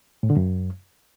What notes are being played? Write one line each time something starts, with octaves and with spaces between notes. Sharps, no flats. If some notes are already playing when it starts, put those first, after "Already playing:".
A2
D3
F#2